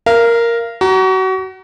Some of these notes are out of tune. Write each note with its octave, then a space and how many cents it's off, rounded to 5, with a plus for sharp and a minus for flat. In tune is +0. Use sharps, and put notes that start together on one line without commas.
A#4 +0 F5 -35
F#4 +30 A#5 +0